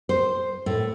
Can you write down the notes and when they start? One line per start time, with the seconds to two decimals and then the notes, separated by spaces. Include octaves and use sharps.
0.09 C5
0.66 A2